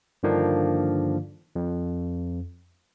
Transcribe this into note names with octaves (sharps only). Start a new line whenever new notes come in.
G2 D3 D#3 F3 A#3 D4
F2